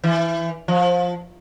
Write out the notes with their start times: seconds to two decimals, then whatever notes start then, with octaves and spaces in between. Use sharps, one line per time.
0.04 E3
0.68 F3